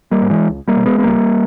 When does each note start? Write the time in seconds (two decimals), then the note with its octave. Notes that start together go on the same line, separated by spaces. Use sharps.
0.11 G3 A#3
0.22 G#2
0.30 E3 G#3
0.49 C#2
0.68 G3 A#3
0.76 B2
0.86 G#3 B3
0.98 B3
1.04 C#2 G3 A#3